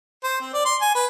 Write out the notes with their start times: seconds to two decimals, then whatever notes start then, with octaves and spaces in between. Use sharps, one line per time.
0.24 C5
0.41 C4
0.54 D5
0.65 C6
0.81 G#5
0.95 B4